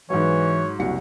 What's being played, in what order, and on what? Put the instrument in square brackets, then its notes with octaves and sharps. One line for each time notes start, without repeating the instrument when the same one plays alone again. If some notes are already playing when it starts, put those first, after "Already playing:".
[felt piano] G#2 F#3 [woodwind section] E3 [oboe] C#5
[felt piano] F#1 C2 C#7 [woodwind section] F#4